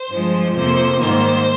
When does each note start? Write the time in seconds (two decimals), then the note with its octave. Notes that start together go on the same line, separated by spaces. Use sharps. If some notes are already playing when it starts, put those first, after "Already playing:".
Already playing: C5
0.10 G2 F3 G#3
0.55 F2 C3 F3 A#3 C5
0.99 G#2 D#3 G3 A#3 C5